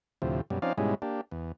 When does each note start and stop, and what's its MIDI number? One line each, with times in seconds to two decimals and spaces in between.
0.22 0.41 38
0.22 0.41 45
0.22 0.41 48
0.22 0.41 53
0.50 0.59 42
0.50 0.59 47
0.50 0.59 55
0.62 0.73 53
0.62 0.73 60
0.62 0.73 61
0.62 0.73 63
0.62 0.73 74
0.62 0.73 77
0.78 0.95 44
0.78 0.95 47
0.78 0.95 55
0.78 0.95 56
0.78 0.95 61
0.78 0.95 64
1.02 1.21 58
1.02 1.21 62
1.02 1.21 67
1.31 1.52 40